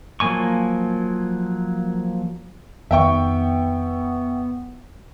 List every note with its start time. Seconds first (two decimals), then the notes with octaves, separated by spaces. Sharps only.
0.20 F3 F#3 A#3 G#5 C#6
2.91 F2 D#3 B3 E5 G5 C#6